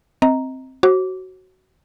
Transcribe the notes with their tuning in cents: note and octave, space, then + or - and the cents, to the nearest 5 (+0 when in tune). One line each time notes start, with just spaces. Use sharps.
C4 +0 D#5 +30 A#5 +0
F#4 +15 C5 +45 D6 -15